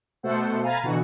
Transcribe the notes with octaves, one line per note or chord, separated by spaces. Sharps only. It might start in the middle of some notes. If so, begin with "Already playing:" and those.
B2 A3 A4 C5 F#5
F5 G#5 A#5 B5 A6
B2 D3 E3 F#4